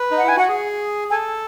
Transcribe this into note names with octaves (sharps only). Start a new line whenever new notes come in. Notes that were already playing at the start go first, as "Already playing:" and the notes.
Already playing: B4
D#4
F#5
E4 G#5
F#4 F#5
G#4
A4 G#5